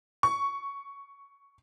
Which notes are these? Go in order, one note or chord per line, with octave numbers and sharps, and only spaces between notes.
C#6